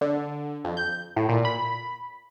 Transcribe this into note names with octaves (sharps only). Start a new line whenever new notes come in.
D3
F2
G6
A2
A#2
B5